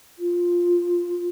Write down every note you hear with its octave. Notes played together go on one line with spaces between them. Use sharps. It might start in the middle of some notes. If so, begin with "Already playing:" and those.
F4